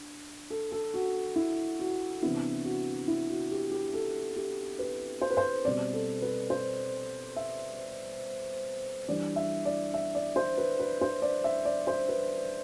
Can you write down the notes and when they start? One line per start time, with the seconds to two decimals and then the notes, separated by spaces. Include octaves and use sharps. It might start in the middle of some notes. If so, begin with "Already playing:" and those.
Already playing: D4
0.50 A4
0.72 A4
0.94 F#4
1.36 E4
1.80 F#4
2.22 C3 E3 B3 D4 E4
2.65 F#4
3.08 E4
3.29 F#4
3.51 G4
3.71 G4
3.94 A4
4.37 G4
4.79 B4
5.22 C5
5.30 B4
5.37 C5
5.65 B2 G3 C4 D5
5.93 A4
6.22 B4
6.50 C5
7.36 E5
9.09 E3 G3 D4 D5
9.36 E5
9.65 D5
9.94 E5
10.15 D5
10.36 C5
10.58 B4
10.80 B4
11.01 C5
11.22 D5
11.44 E5
11.65 D5
11.87 C5
12.09 B4